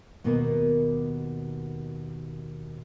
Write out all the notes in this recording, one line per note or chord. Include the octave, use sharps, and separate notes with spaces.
D#2 B2 A#3 B3 A#4